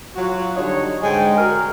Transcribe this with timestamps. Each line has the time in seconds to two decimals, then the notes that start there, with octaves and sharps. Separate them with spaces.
0.16 F#3 F4 F#4
0.56 D3 G3 D#4 C#5
1.03 G#2 D3 G#3 G5 G#5
1.38 F#4 A#4